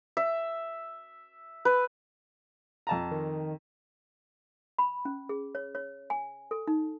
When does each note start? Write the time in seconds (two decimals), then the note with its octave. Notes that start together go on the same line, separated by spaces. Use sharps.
0.17 E5
1.65 B4
2.87 F2 A5 A#5
3.11 D#3
4.78 B5
5.05 C#4
5.29 G#4
5.55 C#5
5.75 C#5
6.10 G#5
6.51 A4
6.67 D#4